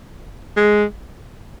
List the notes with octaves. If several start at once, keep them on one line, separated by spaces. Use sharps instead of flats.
G#3